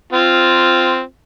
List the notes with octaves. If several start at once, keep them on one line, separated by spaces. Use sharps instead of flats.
C4 F4